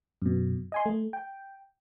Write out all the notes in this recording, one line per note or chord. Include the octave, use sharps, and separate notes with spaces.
F#2 B2
D#5 G#5 C6
A3
G5